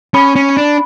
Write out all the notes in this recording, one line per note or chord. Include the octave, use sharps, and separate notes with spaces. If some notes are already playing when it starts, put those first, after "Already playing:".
C#4 B5
C#4
D4